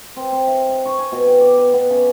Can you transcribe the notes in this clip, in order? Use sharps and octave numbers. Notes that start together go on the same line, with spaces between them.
C4
C4
E5
D#5
C#6
G#5
B2
G5
D5
B4
B3
C#3